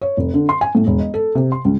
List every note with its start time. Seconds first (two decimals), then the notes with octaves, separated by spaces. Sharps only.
0.01 C#5
0.17 F1
0.34 D3
0.49 C6
0.61 G#5
0.75 A2
0.87 E1
0.99 D#5
1.14 A4
1.35 C3
1.52 C6
1.65 C#2